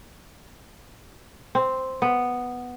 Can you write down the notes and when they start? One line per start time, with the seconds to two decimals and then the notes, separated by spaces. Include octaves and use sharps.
1.55 C4
2.02 B3